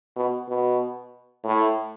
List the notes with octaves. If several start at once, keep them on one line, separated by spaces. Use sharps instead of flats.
B2
B2
A2